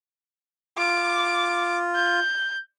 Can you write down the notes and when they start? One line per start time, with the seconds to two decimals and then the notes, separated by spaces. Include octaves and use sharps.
0.78 F4 D6
1.96 G6